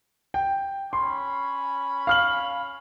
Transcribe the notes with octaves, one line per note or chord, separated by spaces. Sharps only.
G5
C#4 B5 C6
F5 F6 F#7